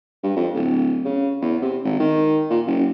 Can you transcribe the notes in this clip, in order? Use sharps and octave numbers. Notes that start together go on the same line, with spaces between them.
G2
F2
D1
C#3
E2
C3
G#1
D#3
A#2
F#1